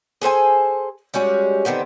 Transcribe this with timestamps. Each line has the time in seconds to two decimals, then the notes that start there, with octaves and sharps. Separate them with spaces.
0.22 G#4 A4 C5 G#5
1.14 G3 G#3 C#4 F#4
1.65 D3 D#3 B3 C4